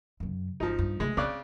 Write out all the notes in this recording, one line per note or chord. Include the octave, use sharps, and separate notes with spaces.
F#2 C#3
G#1 F3 D#4
G2
C#3 G#3 A3
C#3 C4 D5 F#6